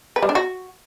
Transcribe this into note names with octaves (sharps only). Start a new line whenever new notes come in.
B4
G3
D4
F#4